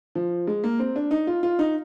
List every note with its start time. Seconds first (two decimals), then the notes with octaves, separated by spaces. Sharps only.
0.15 F3
0.47 G#3
0.64 A#3
0.79 C4
0.96 D4
1.11 D#4
1.27 F4
1.43 F4
1.59 D#4